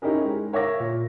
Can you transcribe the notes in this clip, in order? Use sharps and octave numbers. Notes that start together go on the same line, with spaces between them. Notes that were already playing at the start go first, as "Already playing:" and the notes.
C#4 D#4 E4 G4 G#4 A#4
G#3
A#4 C#5 E5 F5 D6 A#6
A#2